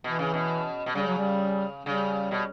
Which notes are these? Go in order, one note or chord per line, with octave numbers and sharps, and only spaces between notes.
B2 E3
C#3
B2
B2
C#3 G3
F#3
G3
C#3 G3
B2